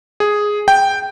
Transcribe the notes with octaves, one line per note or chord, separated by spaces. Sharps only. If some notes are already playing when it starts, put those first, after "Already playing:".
G#4
G5